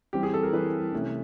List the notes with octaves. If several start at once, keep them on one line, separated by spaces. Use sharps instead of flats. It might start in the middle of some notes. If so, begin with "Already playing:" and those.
E3 G3 C4 G4
G#4
A4
A#4
E3 G3 C4 B4
C3 E3 A3 C#4 E4